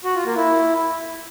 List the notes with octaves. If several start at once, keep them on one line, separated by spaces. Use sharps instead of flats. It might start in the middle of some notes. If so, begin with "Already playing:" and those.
F#4
F4
A#3
E4